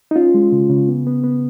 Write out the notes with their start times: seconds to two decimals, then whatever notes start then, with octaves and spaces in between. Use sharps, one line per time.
0.11 D#4
0.16 C#4 F4
0.34 G#3
0.52 C#3
0.70 C#3
0.89 B3
1.07 B3
1.24 B3